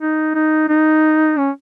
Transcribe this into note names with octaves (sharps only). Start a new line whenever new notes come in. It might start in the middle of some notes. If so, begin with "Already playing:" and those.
D#4
D#4
D#4
C#4